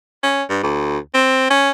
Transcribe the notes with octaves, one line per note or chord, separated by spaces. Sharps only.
C#4
G2
D2
C4
C#4